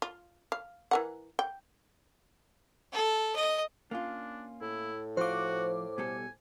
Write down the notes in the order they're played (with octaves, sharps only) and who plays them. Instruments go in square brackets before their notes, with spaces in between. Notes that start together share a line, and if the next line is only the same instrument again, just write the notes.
[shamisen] F4
F5
E3 A#4 F#5
G5
[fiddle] A4
D#5
[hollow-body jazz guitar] A#3 C#4 F4 [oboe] D4
[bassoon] A2 [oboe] E4
[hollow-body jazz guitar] F3 F4 [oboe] F#4 [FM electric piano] C5 D6
[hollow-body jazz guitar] B2 G3 A4 [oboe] G#5